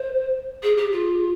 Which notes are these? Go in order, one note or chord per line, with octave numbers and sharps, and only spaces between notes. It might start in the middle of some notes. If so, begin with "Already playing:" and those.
Already playing: C5
G#4
G4
F4